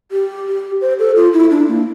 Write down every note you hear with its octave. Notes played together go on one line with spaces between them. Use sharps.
G4
G4
C5
A4
F4
E4
D4
A#3